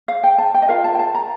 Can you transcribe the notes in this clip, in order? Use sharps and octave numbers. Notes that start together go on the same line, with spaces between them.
F5
G5
A5
G5
D#5
F4 A#4 F5
A5
G5
A5
A#5